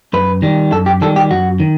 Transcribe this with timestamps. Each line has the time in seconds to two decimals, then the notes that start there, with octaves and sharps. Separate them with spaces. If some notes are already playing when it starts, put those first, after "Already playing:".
0.13 F#2 B4
0.42 D#3 G3
0.72 F#2 A4
0.86 G4
1.02 D#3 G3 A4
1.16 G4
1.31 F#2 F#4
1.60 D#3